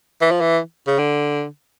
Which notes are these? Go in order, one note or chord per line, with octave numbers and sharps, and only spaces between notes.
E3
F3
E3
C#3
D3